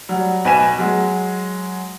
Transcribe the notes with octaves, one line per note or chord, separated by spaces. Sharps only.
F#3 G3
B1 B4 G#5 B6 E7
F#3 G#3